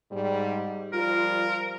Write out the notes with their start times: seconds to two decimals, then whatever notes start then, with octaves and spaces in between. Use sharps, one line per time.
0.10 G#2 G3
0.93 F3 G3 F4 A#4